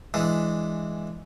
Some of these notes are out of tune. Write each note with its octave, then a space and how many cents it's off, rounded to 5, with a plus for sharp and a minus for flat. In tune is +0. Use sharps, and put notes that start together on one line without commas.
E3 +5 G#3 +0 D4 +0